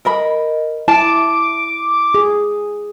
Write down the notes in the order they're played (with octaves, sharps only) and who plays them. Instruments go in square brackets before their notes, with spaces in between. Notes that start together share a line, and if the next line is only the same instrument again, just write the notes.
[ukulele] A#4 D#5 B5
[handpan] E4 [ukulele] A5 [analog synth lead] D6
[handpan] G#4